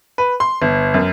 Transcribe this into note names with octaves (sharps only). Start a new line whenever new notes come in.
B4
C6
G1
F#2